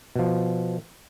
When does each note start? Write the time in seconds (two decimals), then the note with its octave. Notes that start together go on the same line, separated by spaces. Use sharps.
0.16 B2 F3